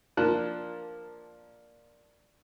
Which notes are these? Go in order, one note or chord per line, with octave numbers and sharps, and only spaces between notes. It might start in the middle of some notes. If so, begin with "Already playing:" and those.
F3 A#3 D4 A5 F#6